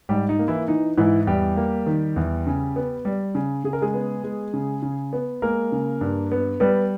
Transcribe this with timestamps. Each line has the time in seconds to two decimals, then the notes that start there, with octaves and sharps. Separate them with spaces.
0.09 G#2 G3 G4
0.29 D#4
0.39 A#3
0.48 E3 E4
0.68 E3 D#4
0.97 G#2 E3 E4
1.27 E2 G3 G4
1.57 A#3
1.87 D#3
2.16 E2
2.47 C#3
2.76 B3
3.05 G3
3.35 C#3
3.64 C#3 G#4
3.73 A#4
3.81 G#3 G#4
3.94 B3
4.24 G#3
4.54 C#3
4.83 C#3
5.13 B3
5.42 G#3 A#3 A#4
5.72 C#3
6.01 G2
6.32 B3
6.60 G3 B3 B4